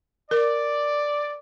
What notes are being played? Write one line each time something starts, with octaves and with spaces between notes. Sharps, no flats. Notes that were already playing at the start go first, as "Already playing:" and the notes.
A#4 D5